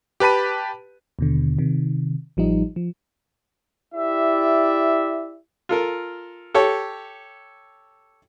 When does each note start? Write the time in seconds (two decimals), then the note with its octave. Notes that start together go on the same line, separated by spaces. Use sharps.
0.20 G4 B4 A5 B5 D#7
1.19 D#2 B2 D3
1.59 C3 D#3
2.37 A1 F3 G3 D#4
2.76 F3
3.95 E4 G4 D5 E5
5.69 F4 A4 A#4
6.54 G4 A4 C#5